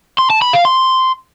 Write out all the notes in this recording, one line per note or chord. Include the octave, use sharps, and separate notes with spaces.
C6
A5
B5
F5
C6